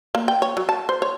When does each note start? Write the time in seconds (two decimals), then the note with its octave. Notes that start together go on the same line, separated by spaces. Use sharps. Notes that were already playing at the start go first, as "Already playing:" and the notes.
0.15 A#3
0.28 G5
0.42 C#5
0.57 F#3
0.69 A5
0.89 C5
1.02 C#5